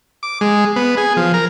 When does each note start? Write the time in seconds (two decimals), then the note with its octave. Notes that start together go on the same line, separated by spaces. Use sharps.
0.23 D6
0.41 G#3
0.76 B3
0.97 G#4
1.17 F3
1.34 A#4